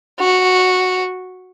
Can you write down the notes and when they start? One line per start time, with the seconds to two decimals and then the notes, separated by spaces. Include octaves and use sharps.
0.19 F#4